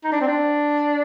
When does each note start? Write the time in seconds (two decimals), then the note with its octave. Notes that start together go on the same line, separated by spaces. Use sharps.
0.04 D#4
0.12 D4
0.20 C4
0.28 D4